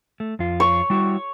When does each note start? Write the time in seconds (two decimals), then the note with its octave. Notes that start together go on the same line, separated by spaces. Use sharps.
0.20 A3
0.39 F2 F4
0.60 C#5
0.90 G3 E4 F#4